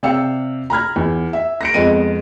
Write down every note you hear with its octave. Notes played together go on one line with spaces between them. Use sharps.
C3 D5 F5 G5 E6 C#7
A#5 B5 F6 G#6
E2
E5
A#6 C#7 D7
F2 G#3 B3 D#5 D#7